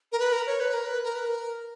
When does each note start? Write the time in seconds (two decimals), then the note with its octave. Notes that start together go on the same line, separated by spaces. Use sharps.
0.12 A#4
0.19 B4
0.32 A#4
0.47 C#5
0.60 B4
0.73 A#4
0.86 B4
1.04 A#4
1.16 B4
1.26 A#4